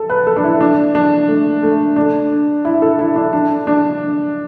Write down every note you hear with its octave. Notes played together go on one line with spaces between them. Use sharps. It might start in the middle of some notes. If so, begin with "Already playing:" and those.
Already playing: A4
B4
A4
D4
E4
D4
D4
A3
A3
D4
E4
A4
E4
D4
D4
D4